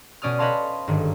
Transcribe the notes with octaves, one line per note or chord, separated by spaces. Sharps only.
B2 C#4 D5 D#6 F6
B4 C#5 D#5 F5 A5 C6
G1 G#2 D#3